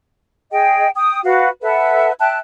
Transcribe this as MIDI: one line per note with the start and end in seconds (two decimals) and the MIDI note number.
0.51 0.88 68
0.51 0.88 75
0.51 0.88 79
0.95 1.19 79
0.95 1.19 87
1.24 1.49 66
1.24 1.49 71
1.24 1.49 77
1.24 1.49 78
1.62 2.11 69
1.62 2.11 71
1.62 2.11 76
1.62 2.11 78
2.19 2.37 76
2.19 2.37 79
2.19 2.37 81
2.19 2.37 90